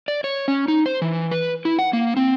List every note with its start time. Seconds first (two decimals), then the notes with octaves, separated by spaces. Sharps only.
0.08 D5
0.24 C#5
0.48 C#4
0.68 D#4
0.86 C5
1.02 E3
1.31 B4
1.65 E4
1.79 F#5
1.93 A#3
2.17 C4